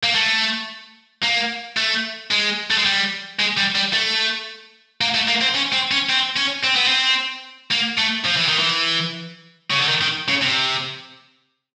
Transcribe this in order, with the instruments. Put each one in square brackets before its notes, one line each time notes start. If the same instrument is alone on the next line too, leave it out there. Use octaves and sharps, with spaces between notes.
[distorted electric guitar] A#3
A3
A#3
A3
G#3
A3
G#3
G3
G#3
G3
G3
A3
A#3
A3
A#3
C4
C#4
C4
C#4
C4
C#4
C4
B3
C4
A#3
A3
F3
E3
D#3
E3
C#3
D3
D#3
D#3
C#3
C3